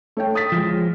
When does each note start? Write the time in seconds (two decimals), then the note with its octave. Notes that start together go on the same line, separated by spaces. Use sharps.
0.17 A3 C#5 G5
0.35 D#6 A6 B6
0.52 F3 G#3